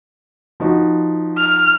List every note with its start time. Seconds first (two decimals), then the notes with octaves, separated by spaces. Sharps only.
0.60 F3 D#4 F#4
1.38 F6